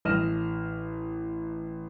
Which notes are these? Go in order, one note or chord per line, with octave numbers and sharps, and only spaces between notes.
A1 D#5 F6 A#6 E7